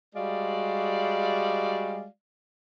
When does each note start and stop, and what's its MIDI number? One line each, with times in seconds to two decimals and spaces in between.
0.15 2.05 55
0.15 2.05 56
0.15 2.05 66
0.15 2.05 74
0.15 2.05 77